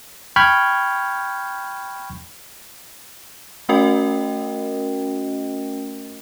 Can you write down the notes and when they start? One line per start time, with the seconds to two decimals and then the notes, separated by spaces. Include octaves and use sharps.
0.36 G5 B5 C#6 F6 G6 G#6
3.69 A3 C#4 F#4 A#4 D#5 G5